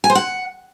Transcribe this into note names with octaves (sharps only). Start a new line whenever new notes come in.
G#5
C5
F#5